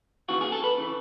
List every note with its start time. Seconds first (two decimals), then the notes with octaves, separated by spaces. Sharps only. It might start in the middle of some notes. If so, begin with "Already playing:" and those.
0.29 D#2 C#3 E3 F#4
0.41 G#4
0.52 A4
0.64 B4
0.78 C#3 E3